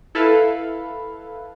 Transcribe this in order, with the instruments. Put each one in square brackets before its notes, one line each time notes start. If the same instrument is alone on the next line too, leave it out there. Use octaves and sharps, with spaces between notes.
[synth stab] E4 A4 B4 F5